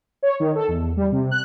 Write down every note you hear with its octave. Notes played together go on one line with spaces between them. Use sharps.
C#5
D#3
A4
E2
G3
C3
F#6